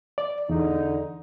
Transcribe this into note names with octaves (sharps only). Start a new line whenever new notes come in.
D5
E2 D3 D#4